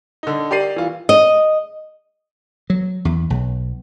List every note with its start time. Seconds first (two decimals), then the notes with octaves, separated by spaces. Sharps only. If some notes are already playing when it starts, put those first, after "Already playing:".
0.23 D3 D#4
0.51 G4 A#4 D5 C7 D#7
0.76 E3 F4
1.09 D#5
2.70 F#3
3.05 E2
3.30 B1